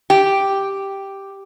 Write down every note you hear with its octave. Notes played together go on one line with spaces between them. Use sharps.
G4